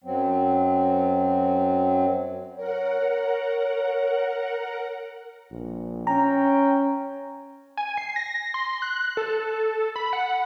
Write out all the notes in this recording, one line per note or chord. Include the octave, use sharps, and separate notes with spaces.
F#2 F#3 C4
A#4 C#5 F#5
A#1
C#4 G5 A#5
G#5
C7
A#6
C6
F#6
A4
B5
F#5